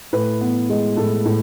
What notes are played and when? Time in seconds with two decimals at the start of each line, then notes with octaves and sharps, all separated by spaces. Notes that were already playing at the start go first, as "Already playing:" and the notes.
0.13 A2 B4
0.41 B3
0.70 G#3
0.97 A2 A4
1.25 A2